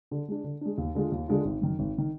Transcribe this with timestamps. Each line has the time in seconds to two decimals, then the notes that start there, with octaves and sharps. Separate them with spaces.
0.11 D3
0.28 G#3 D4
0.44 D3
0.61 G#3 D4
0.78 D#2
0.95 D3 G#3 D4 F4
1.12 D#2
1.28 D3 G#3 D4 F4
1.45 G#1
1.62 F#2 D#3
1.79 G#1
1.98 D#3